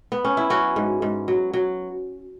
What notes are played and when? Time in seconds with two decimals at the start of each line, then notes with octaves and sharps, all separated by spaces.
0.12 B3
0.25 C#4
0.37 E4
0.50 F#3 C#4 F#4
0.76 G#2
1.02 G#2
1.28 F#3
1.53 F#3